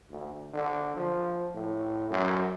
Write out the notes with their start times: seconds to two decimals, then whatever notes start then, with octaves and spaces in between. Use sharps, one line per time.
0.10 D2
0.54 D3
0.97 F3
1.55 A2
2.11 F#2